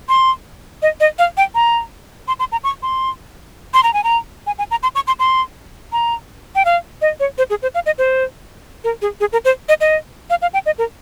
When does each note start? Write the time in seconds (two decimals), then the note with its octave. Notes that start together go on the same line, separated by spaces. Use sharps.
0.09 C6
0.82 D#5
1.00 D#5
1.19 F5
1.37 G5
1.55 A#5
2.28 C6
2.39 C6
2.52 A#5
2.64 C#6
2.83 C6
3.74 C6
3.83 A#5
3.94 G#5
4.04 A#5
4.47 G#5
4.59 G#5
4.71 A#5
4.83 C6
4.95 C#6
5.07 C6
5.19 C6
5.92 A#5
6.55 G5
6.65 F5
7.02 D#5
7.20 C#5
7.38 C5
7.50 G#4
7.62 C5
7.75 F5
7.86 D#5
7.98 C5
8.84 A#4
9.02 G#4
9.20 G#4
9.32 A#4
9.45 C5
9.69 D#5
9.81 D#5
10.30 F5
10.42 F5
10.54 G5
10.66 D#5
10.78 A#4